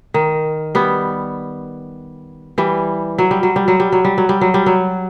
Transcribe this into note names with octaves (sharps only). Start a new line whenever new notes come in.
D#3
G3 B3
E3 G3
F#3
G3
F#3
G3
F#3
G3
F#3
G3
F#3
G3
F#3
G3
F#3